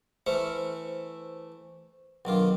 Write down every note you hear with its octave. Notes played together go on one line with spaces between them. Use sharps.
E3 A3 C5 E5
B1 D#3 F#3 D4 F4